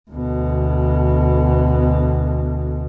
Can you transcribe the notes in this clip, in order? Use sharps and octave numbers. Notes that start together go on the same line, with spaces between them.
D2 B2